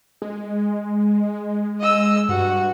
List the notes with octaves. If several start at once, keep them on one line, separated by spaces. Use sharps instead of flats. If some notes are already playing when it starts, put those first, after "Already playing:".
G#3
D#5 E6
G2 F#4